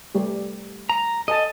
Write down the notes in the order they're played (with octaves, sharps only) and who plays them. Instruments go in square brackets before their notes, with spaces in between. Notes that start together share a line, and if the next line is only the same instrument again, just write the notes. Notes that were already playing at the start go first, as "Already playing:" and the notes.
[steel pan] G3 A3 G4
[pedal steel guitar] A#5
[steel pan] A4 G#5 A5 [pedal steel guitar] D#5